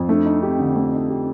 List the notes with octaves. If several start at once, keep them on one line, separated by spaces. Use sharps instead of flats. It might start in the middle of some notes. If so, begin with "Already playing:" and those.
Already playing: F2
A3 D4 E4
D#4
C4 G4
D3
A3
D#4
G4